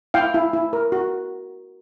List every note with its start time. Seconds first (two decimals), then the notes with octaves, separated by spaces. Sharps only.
0.14 E4 F5 G5
0.34 E4
0.53 E4
0.73 A#4
0.92 F#4